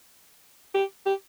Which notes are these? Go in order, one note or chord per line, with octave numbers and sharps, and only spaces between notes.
G4
G4